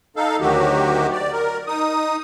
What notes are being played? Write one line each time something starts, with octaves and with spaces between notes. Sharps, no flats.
D#4 A4 F5
D2 D#3 F#3 F#4 G4
D5
A#4
D#4 D#6